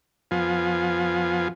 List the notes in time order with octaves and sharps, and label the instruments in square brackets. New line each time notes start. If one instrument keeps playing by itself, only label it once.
[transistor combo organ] F2 F3 B3 F4 G#5